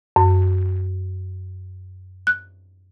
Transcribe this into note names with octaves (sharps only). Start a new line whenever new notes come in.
F#2
F#6